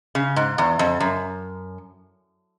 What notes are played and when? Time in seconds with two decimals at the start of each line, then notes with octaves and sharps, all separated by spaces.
0.15 C#3
0.36 G#2
0.58 E2
0.79 F2
1.00 F#2